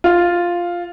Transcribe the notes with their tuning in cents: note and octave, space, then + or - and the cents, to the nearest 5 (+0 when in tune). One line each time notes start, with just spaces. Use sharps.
F4 +0